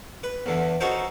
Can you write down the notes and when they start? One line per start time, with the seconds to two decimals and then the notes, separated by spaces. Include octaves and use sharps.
0.23 B4
0.46 E2 D3 E3
0.80 C#4 D#4 F#4 A4 A#4 C5